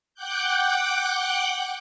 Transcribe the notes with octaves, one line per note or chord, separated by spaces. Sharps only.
F#5 G5 D6 F#6 G6